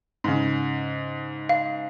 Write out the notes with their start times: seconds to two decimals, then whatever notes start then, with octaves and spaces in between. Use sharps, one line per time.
0.24 G#2 C#3
1.49 F5